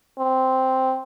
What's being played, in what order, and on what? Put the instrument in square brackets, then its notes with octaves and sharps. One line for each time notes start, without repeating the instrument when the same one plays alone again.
[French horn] C4